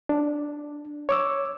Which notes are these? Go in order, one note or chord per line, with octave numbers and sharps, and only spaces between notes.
D4
C#5 D6 E6